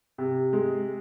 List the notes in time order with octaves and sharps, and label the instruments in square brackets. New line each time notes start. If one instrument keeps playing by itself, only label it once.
[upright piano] C3
G#3